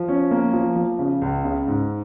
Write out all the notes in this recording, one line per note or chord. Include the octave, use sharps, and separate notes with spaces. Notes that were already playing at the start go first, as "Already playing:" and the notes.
Already playing: F3
C#4
A#3
F3
F3
C#3
C#2
C#3
G#2